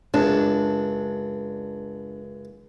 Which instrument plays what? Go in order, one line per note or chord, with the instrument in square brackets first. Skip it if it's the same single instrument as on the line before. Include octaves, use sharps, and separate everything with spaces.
[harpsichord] C#2 F#2 [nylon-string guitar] D4